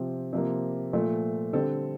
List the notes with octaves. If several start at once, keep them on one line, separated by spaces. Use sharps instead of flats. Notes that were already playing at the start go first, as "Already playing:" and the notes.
Already playing: C3 F3 C4
C3 F3 A#3
A#2 F3 A3
D3 G3 C4 A4